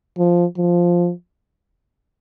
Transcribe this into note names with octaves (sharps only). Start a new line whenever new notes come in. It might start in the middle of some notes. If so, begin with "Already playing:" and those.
F3
F3